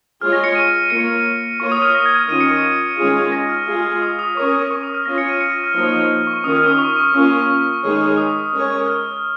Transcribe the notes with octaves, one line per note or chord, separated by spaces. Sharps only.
G#3 F4 G#4 C#5 F6
A#6
C#7
D#7
A#3 F4 C#5 C#7
A#3 F4 A#4 C#5 C#6
D#6
F6
A#6
G#6
F6
D#3 C#4 F4 D#7
C#7
A#6
D#3 G#3 C#4 F4 G#4
A#6
F6
G#3 F4 G#4
D#6
D#6
C#4 A#4 C#5 C#6
D#6
C#6
D#6
F6
C#4 F4 C#5 A#6
C#7
D#7
C#7
A#6
F6
F3 A#3 D#4 C#5
C#6
D#3 C#4 F4 A#4 D#6
F6
D#6
C#6
C#6
A#3 C#4 F4 A#4 C#6
C#6
C#6
D#3 G#3 D#4 G#4 C#5
D#6
G#3 C#4 A#4 C#5
F6